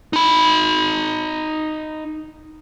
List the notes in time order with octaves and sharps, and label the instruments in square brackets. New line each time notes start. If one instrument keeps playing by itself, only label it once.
[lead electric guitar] D#4 B5